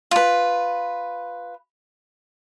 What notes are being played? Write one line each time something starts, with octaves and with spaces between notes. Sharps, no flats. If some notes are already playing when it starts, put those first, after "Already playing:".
F4 B4